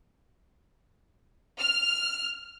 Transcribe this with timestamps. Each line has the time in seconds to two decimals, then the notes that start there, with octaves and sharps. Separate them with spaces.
1.59 F6